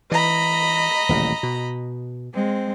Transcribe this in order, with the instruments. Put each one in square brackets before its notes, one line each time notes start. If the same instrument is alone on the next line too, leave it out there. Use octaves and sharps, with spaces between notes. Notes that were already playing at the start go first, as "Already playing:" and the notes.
[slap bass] E3 [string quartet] D#5 A#5 B5
[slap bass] D#1 A1 C#3
B2
[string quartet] G#3 C4